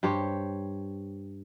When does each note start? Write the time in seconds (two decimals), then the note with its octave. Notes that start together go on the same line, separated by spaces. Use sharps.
0.03 G2 G4 C5 C#5